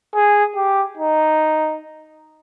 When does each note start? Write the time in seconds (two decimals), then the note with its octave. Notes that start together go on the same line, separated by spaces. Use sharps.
0.15 G#4
0.56 G4
0.97 D#4